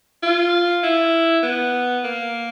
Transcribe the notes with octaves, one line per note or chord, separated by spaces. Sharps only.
F4
E4
B3
A#3